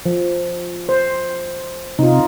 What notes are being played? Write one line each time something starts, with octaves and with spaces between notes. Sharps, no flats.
F3
C5
C3 D#4 F4